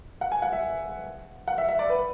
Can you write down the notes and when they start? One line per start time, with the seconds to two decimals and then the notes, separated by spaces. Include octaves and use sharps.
0.21 F#5
0.32 G#5
0.42 F#5
0.53 E5
1.48 F#5
1.58 E5
1.69 E5
1.79 D5
1.90 B4